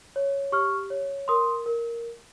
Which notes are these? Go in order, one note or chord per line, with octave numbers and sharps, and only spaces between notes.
C#5
G4 C#6 F6
C#5
A#4 C6 D#6
A#4